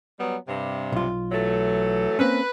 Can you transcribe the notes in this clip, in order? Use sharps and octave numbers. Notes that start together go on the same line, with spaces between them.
F#3 G3 B3
G2 C3
B1 F4
E3 F#3 A3
A#3 C4 C#4 B4